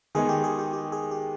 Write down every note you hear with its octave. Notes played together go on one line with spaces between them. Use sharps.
D#3 G#3 B3 D#4 G#4
G4
G#4
G4
G4
G#4
G4